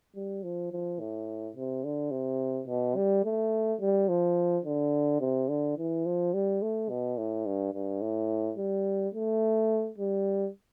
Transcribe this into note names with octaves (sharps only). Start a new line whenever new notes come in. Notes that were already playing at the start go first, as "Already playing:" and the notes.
G3
F3
F3
A2
C3
D3
C3
B2
G3
A3
G3
F3
D3
C3
D3
E3
F3
G3
A3
B2
A2
G2
G2
A2
G3
A3
G3